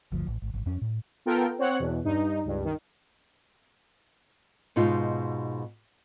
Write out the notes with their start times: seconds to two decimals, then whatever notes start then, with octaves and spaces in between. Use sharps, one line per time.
0.12 G1 D2 F3
0.27 A1
0.42 G#1
0.54 G#1
0.66 F2 C#4
0.82 A2
1.26 B3 F4 A4 A#4 G5
1.59 C4 C#5 F#5 F#6
1.79 E2 B2
2.04 G2 D#4
2.45 C#2 G2
2.65 D#3
4.76 G#2 B2 D#4 F4